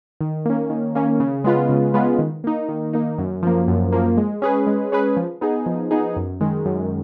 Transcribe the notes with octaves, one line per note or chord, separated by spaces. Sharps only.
D#3
A#3 C#4
D#3
A#3 C#4
C#3
G#3 B3 F4 B4
C#3
G#3 B3 F4 B4
D#3
A#3 D#4
D#3
A#3 D#4
F#2
F3 A#3
F#2
F3 A#3
G#3
C#4 G#4 B4
G#3
C#4 G#4 B4
F3
B3 D#4 G#4
F3
B3 D#4 G#4
F#2
D#3 G#3
F#2